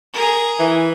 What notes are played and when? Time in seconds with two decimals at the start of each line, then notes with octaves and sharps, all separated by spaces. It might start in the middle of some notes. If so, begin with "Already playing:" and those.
0.13 G#4 A#4
0.59 E3